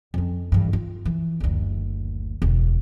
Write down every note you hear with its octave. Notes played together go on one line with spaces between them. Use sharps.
F2 C#4
G2 E3
F4
E3
F#1 D2
E1 D2